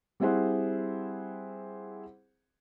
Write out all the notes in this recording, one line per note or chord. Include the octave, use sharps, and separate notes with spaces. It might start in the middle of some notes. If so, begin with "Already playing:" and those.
G3 C4 E4 G#4 C5 F#5